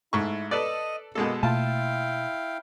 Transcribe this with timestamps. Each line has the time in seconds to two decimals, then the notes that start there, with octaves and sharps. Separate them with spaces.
0.13 G#2 A3 E4 C#6
0.51 A4 B4 D5 D#5
1.15 B2 G#3 A#3 A4
1.43 B2 A3 A#3 E4 F4 F5 G5 A5